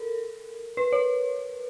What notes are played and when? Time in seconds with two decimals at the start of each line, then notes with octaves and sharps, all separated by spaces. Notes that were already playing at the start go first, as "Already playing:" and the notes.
Already playing: A4 A#4
0.77 B4
0.93 C#5